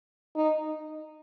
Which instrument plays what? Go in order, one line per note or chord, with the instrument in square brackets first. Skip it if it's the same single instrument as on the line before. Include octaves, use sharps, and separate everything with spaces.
[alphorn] D#4